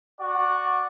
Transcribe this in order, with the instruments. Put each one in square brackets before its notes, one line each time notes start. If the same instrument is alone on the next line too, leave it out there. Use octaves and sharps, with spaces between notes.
[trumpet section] F#4 D5 F#5